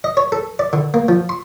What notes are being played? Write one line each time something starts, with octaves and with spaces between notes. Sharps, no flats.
D#5
C#5
A4
D5
D3
A#3
F3
C6